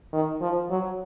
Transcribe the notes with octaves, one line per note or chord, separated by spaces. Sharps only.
D#3
F3
F#3